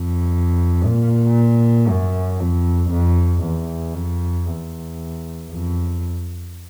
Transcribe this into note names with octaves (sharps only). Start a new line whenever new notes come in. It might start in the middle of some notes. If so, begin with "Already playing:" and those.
Already playing: F2
A#2
F#2
F2
F2
E2
F2
E2
F2